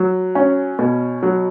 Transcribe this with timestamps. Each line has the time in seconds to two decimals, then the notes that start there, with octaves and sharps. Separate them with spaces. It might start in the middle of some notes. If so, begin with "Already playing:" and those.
Already playing: F#3
0.35 C#4
0.79 B2
1.23 F#3